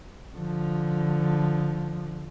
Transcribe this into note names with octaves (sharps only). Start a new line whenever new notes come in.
D3 F3